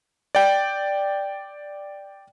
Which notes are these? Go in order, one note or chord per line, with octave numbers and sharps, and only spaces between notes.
D5 G5